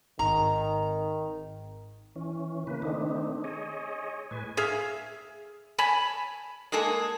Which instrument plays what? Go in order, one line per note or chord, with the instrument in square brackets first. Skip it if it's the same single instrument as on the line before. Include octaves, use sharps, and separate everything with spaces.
[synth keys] G#1 G#2 [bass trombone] D#3 [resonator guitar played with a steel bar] A#5
[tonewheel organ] E3 C#4
C#3 A#3 B4
D#3 A3 C4 D4 D#4
G#4 C#5 D#5
A2 B4 G#5
[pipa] G#4 E5 F5
C#5 G#5 A5 B5
G#3 A#3 G#4 A4